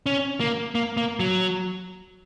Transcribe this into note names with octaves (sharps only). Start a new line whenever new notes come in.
C#4
A#3
A#3
A#3
F#3